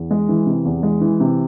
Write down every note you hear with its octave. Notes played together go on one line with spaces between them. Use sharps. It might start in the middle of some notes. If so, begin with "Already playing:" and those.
Already playing: E2
G#3
E3
C3
E2
G#3
E3
C3